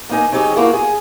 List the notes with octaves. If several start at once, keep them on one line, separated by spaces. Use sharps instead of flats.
A#3 D#4 G#5
C#3 F#3 C#4 D#4 G4 G#4
A3 A#3 E4 F#4
G#4